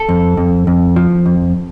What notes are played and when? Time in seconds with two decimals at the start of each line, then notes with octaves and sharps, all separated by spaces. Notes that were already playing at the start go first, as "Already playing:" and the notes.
Already playing: A4
0.09 F2
0.37 F2
0.67 F2
0.96 F3
1.26 F2